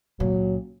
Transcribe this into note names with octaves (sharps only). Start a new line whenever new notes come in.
C#2 A#2 F#3